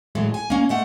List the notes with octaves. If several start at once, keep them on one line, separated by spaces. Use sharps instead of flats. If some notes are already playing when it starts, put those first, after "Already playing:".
A2 E3 F#3 G#3
G#5
A#3 C#4
G#3 A3 F#5